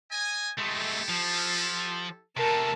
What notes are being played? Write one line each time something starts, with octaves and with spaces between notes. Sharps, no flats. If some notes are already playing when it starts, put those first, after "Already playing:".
D#5 G#5
G#3 A3 E4 G4 A4
F3
C3 A3 A#4 A5